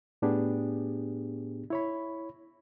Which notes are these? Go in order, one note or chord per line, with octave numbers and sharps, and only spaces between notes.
A2 B3 D4 G4 G#4
E4 C#5 B5